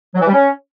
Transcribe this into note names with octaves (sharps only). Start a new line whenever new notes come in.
F#3
E3
G3
C#4